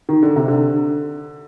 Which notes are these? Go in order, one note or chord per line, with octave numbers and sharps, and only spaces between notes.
D#3
D3
C3
D3